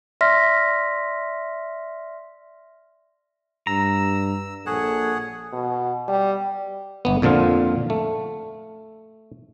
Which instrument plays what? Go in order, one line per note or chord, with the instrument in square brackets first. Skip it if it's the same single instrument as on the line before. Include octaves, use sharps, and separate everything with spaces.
[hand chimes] D5 E5 C6 F6 A#6 B6
[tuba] G2 [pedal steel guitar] A#5 [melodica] E6
[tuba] A#1 [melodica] G#4 C#5 F#5 [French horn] A4
[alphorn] B2
G3
[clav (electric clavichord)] G1 B3
F2 A#2 D3 F3 F4
A3